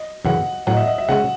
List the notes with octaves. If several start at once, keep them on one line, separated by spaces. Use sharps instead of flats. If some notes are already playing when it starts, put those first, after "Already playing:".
Already playing: D#5
F#2 C#3 E3 F#5
A2 F#3 C#4 F#5
D#5
E5
D#5
E5
C#3 G#3 C#4 F#5